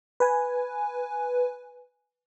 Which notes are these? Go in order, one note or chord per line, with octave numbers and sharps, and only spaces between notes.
B4 G#5